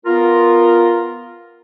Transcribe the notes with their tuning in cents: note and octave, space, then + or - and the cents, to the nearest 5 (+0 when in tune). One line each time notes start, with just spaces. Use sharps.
B3 +0 F4 +0 A#4 +0